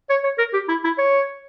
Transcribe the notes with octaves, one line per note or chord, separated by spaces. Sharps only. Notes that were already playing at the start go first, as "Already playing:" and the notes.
C#5
C#5
A#4
G4
E4
E4
C#5